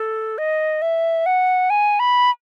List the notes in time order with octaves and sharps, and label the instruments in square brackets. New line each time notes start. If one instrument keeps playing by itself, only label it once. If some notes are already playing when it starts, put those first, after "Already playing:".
Already playing: [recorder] A4
D#5
E5
F#5
G#5
B5